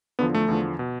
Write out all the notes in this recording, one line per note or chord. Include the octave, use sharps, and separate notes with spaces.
E2 D3 F3 B3
A3
E2 D3 F3
B2